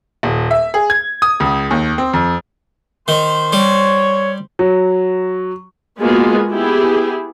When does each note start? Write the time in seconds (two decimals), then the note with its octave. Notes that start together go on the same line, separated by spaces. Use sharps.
0.23 D#1
0.51 E5
0.74 G#4
0.90 G#6
1.22 D#6
1.40 C#2
1.71 D#2
1.98 C4
2.13 F2
3.08 D#3 C5
3.53 G3 C#5
4.59 F#3
5.99 G#3 A#3 B3 F4 F#4 G#4
6.49 B3 E4 G4 G#4